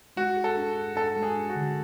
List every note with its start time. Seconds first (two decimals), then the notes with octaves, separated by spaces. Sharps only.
0.17 G#3 F#4
0.37 G#4
0.44 A4
0.57 D4
0.76 G#4
0.96 D4 A4
1.16 G#3
1.22 G#4
1.36 D4
1.49 F#4
1.56 D3